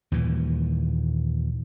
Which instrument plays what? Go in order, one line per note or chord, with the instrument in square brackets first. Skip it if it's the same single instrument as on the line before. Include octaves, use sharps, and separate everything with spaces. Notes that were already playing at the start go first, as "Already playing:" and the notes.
[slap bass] D#2 A#2 E3